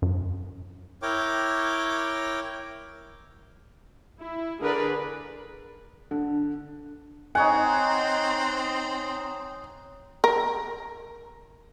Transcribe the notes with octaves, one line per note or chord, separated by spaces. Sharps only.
F#2
E4 A#4 C#5 G5 D6
E4
D3 G#4 A#4 B4 D5
D3
C4 D#4 C#5 F#5 G#5
A#4